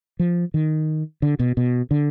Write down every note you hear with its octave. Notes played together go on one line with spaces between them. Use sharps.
F3
D#3
D3
B2
B2
D3